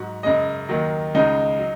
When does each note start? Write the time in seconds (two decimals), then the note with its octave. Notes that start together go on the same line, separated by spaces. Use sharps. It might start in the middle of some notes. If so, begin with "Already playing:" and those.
Already playing: G#2 F#3 F#4
0.23 F#2 C#3 G#3 D#5
0.69 D#2 D#3 F#3
1.15 C#2 C#3 G#3 D#4
1.59 F#3